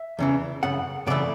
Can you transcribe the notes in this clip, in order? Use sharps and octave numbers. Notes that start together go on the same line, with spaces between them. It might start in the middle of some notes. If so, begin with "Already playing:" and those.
Already playing: E5
E2 C#3 E3
F#2 C#3 F#5
F#2 C#3 E3 A3 D5